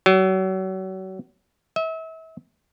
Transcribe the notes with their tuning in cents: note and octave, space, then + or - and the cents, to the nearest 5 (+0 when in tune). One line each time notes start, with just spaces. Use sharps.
F#3 +35
E5 -35